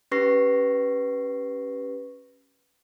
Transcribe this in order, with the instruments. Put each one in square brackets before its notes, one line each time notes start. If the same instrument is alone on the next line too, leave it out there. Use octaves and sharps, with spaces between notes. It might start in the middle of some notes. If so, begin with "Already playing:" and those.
[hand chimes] C#4 G4 B4 C#6 A#6 C7